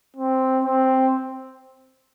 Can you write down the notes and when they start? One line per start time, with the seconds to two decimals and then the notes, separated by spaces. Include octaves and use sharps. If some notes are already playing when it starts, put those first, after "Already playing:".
0.16 C4
0.64 C4